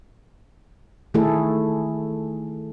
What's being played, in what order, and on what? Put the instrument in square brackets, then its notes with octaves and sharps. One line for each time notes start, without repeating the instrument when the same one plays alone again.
[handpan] D#3 A3 E4 G#4 A4